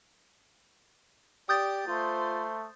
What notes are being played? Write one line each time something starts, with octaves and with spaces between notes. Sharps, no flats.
G4 D5 D#6 G6 A6
A3 F4 C5